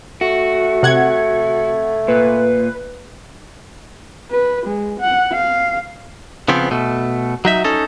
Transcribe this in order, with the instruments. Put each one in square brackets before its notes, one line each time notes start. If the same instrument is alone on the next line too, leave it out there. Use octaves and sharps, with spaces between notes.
[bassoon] A3 [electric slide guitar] F#4
[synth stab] C3 F#5 G#6
[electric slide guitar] A#2 [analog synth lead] B4
[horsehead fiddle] B4
G#3
F#5
F5
[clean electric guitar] C#3 F3 B3 C4
B2 A3
F#3 D#4 E5
C#4 D#4 A4